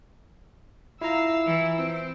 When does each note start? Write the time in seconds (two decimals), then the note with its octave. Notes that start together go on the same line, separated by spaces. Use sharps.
1.01 E4 F4 F5 A#5 E6
1.47 E3
1.77 C4